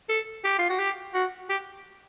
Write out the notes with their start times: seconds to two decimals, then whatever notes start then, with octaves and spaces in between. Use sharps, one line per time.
0.09 A4
0.44 G4
0.58 F4
0.69 F#4
0.79 G4
1.14 F#4
1.49 G4